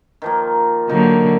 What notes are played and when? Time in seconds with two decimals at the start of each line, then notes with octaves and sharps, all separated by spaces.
0.22 D#3 F3 A#3
0.89 D3 F#3 A#3 D#4